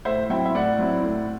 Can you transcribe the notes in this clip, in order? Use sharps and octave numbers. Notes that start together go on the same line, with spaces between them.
A2 C5 E5
F#3 C4 E4 E5 G5
E5
A2 D5 F#5
F#3 C4 E4
A2